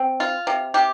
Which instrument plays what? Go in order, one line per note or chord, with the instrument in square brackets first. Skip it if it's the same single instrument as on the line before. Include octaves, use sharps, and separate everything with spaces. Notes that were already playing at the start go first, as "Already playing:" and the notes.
Already playing: [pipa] C4
F4
C3
C3 G4